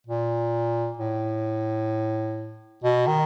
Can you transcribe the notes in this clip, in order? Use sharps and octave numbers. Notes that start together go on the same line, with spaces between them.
A#2
A2
B2
D#3